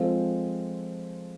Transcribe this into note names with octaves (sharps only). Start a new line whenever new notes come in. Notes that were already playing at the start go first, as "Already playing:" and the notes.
Already playing: F3 G#3 C4 F4 A4